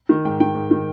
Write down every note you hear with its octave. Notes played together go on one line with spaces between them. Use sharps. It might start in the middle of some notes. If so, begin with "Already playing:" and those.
D#3
G#2 G5
D#3 G5
G#2
D#3